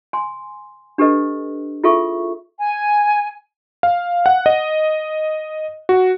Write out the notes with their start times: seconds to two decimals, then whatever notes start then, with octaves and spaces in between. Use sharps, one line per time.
0.13 G#5 C6
0.98 D4 G4 A4 B4 D#5
1.84 E4 F4 G#4 A4 E5 C#6
2.59 G#5
3.83 F5
4.26 F#5
4.46 D#5
5.89 F#4